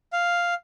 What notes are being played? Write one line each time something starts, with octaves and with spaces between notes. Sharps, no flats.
F5